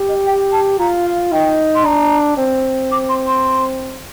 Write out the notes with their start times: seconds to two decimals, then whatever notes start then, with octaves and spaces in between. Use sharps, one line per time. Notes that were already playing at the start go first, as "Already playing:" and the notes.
Already playing: G4
0.09 D#5
0.26 G5
0.52 A5
0.79 F4 A#5
1.06 F5
1.32 D#4 G5
1.75 C6
1.85 D4 A#5
2.38 C4
2.92 D6
3.09 C6
3.27 C6